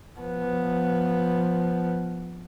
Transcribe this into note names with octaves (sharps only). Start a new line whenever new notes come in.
F3 B3